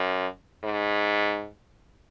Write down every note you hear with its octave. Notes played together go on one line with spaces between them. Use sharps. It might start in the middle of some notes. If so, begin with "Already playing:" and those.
Already playing: F#2
G#2